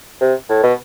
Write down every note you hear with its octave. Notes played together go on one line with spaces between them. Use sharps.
C3
A2
B2